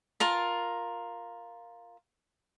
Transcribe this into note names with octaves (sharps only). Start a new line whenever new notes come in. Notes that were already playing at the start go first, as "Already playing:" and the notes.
F4 A#4 A5